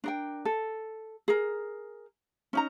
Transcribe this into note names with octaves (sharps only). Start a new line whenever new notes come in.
D4 A#4 G5
A4
G#4 A#4
C#4 D#4 A#5